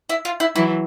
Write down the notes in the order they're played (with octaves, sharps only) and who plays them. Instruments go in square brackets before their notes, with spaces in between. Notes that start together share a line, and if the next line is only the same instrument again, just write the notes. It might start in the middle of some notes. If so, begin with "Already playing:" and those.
[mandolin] E4
F4
E4
[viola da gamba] E3 F#3 [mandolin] E4